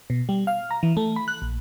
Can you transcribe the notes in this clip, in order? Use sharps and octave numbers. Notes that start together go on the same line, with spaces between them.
B2
G3
F5
A#5
E3
A3
B5
F#6
A#1